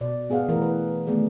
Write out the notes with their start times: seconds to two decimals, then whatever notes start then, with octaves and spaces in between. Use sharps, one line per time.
0.01 B2 D5
0.30 B3 G#4 B4 F5 F#5
0.48 E3 A3 A#4
0.62 B4
1.07 D#3 A3 B3 G#4 D5